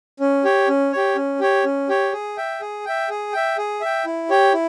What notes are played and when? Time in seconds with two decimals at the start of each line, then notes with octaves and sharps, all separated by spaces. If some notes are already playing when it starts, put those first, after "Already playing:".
0.20 C#4
0.44 G4 C#5
0.68 C#4
0.93 G4 C#5
1.16 C#4
1.40 G4 C#5
1.65 C#4
1.89 G4 C#5
2.13 G#4
2.37 E5 G5
2.61 G#4
2.85 E5 G5
3.09 G#4
3.33 E5 G5
3.58 G#4
3.81 E5 G5
4.06 E4
4.29 G4 C#5 G5
4.53 E4